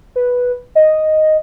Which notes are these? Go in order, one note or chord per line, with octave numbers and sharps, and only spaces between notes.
B4
D#5